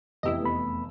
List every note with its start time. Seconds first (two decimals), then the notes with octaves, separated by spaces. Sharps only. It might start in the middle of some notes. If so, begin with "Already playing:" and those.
0.23 F1 E2 E4 G4 D#5 E6
0.42 A3 B3 B5